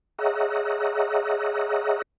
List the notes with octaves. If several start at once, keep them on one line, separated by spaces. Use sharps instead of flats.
G#4 C#5 D#5 E5 F#5 A#5